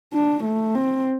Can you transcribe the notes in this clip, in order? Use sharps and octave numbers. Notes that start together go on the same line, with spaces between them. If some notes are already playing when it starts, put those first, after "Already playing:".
D4
A3
C4